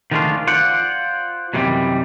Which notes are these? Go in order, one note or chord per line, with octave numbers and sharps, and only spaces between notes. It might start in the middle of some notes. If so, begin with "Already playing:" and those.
D#3 F3 G#3 A3 D4 F4
F4 C5 D5 F#5
F#2 C3 D#3 E3 G3